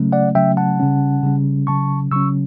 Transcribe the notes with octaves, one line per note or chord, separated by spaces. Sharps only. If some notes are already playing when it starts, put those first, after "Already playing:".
Already playing: C#3 F#3 A3 C#4
D5 F#5
C#3 F#3 A3 C#4 E5 G5
F#5 A5
C#3 G3 C#4
C#3 G3 C#4
C#3 F#3 C#4 A5 C#6
C#3 F#3 C#4 C#6 E6